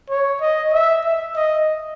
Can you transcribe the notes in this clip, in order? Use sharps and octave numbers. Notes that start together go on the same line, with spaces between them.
C#5
D#5
E5
E5
D#5